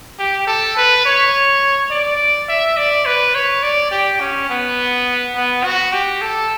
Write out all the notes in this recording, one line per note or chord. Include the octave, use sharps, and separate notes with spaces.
G4
A4
B4
C#5
D5
E5
D5
B4
C#5
D5
G4
C#4
B3
B3
F#4
G4
A4